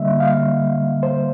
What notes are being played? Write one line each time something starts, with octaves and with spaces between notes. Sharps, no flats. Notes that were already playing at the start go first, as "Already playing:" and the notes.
Already playing: D3 G3 A#3 D#5 E5
F5
C5